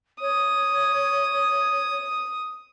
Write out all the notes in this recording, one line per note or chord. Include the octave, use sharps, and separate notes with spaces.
C#5 D#6